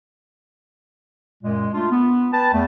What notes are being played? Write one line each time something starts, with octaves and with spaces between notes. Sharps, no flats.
F#2 A#2 G#3
A3 D4 F4
B3
B4 G5 A5
E2 A3